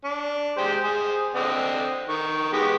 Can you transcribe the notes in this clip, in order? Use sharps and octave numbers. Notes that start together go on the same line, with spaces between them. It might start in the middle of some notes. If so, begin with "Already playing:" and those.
D4
G#3 G4 C5
G#4 C5
D3 C4 D#5
D#3 C#6
G#3 B3 G4